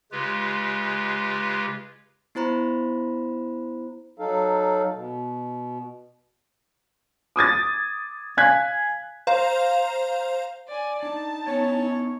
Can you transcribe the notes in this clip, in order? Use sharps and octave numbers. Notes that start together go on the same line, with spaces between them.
C#3 G#3 F4 G4 B4
B3 E4 C5 A#5 B5
F#3 D#4 A4 F5
B2
D6 D#6 G#6 A6
F5 G#5 F#6 G#6 B6
C5 F5 A#5
D5 G#5
D4 D#4 A5
B3 C#4 C#5 G5